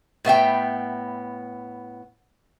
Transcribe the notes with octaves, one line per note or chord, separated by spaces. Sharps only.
A2 B3 E5 G5